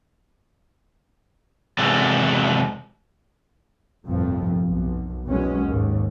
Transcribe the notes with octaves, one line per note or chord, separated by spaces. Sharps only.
E2 C3 F#3 G#3 A4
G1 C2 F2 A2 F3
B1
B1 E2 A#2 F#3 G#3 C#4
D#2 G#2